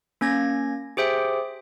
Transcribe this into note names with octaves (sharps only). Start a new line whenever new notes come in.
A#3 C#4 G#6 A#6
G4 G#4 C5 E5 G5